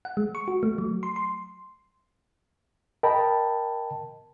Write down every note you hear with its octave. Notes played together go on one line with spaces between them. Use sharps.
F#5
G#3
C#6
F#4
A3
F#3
C6
C6
A#4 D#5 G5 A5 B5